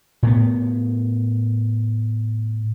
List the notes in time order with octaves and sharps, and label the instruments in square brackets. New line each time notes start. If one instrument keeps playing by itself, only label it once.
[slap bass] A2 B3